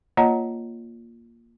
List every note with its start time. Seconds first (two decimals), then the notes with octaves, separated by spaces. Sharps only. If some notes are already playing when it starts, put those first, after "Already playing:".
0.17 A#3 F4 C#5 D#5 F#5 A#5